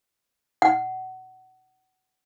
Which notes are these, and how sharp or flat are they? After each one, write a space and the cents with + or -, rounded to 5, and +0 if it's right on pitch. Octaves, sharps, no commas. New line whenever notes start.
F#5 +25